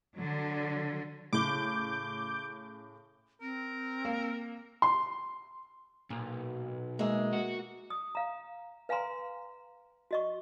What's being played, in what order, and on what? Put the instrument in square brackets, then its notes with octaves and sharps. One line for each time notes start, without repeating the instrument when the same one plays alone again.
[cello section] D3 F#3
[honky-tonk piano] A2 C#3 [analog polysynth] D6 G6
[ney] C4 [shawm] A#4
[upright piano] A#3
C6
[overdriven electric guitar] B1 [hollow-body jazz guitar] A#2
[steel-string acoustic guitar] G#3 [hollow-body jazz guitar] A#3 E5
[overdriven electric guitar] F#4
[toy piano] D#6
F5 A#5
B4 F5 G#5 A#5 C6
F#4 D#5 C#6